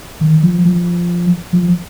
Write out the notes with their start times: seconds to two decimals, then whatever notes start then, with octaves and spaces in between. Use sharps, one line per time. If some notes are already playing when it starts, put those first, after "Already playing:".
0.21 D#3
0.43 F3
0.65 F3
1.53 F3